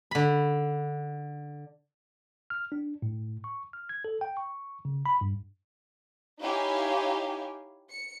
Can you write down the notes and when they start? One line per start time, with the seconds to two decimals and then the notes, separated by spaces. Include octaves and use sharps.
0.11 D3 B5
2.50 F6
2.72 D4
3.02 A2
3.44 C#6
3.73 F6
3.89 G#6
4.05 A4
4.21 G5
4.37 C#6
4.85 C#3
5.06 B5
5.21 G2
6.41 D#4 E4 G4 C#5 F5 G#5
7.90 C#7